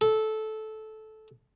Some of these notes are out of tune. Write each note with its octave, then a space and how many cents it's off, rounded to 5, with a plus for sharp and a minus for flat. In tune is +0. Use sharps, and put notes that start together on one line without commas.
A4 -15